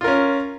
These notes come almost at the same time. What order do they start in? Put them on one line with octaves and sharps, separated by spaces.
F4 A#4 C#4